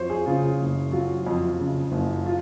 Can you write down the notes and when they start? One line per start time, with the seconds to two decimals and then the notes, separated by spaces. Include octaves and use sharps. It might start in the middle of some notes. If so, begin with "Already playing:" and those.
Already playing: F2 F#3 C5 C#5
0.10 G#4
0.26 C#3 F4
0.59 F#1
0.92 F#3 F4
1.27 F2
1.59 C#3
1.92 F#1
2.26 F4